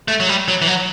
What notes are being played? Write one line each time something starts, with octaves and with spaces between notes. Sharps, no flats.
A3
F#3
G3
F#3
E3
F#3